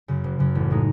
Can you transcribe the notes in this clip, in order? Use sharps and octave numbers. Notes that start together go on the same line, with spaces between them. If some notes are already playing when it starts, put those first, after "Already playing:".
F#2 C#3
F#1
F#2 C#3
A1
A2 G#3 D#4